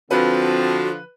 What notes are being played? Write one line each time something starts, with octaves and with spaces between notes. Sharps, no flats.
D3 F3 C4 F#4 B4